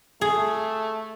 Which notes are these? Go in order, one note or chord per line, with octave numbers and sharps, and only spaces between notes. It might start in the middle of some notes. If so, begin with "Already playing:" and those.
A3 G#4